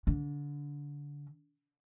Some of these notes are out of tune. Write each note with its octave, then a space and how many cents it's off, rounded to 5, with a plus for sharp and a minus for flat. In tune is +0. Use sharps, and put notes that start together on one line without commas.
D3 -25